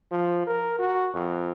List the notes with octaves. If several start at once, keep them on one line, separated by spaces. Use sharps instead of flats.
F3
A#4
F#4
F2